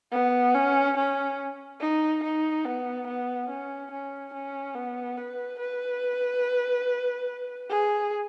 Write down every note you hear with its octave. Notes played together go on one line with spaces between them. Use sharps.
B3
C#4
C#4
D#4
D#4
B3
B3
C#4
C#4
C#4
B3
B4
B4
G#4